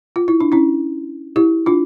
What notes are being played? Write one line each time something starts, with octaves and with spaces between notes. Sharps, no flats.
F4
E4
D4
C#4 E4
E4 G4
D4 F4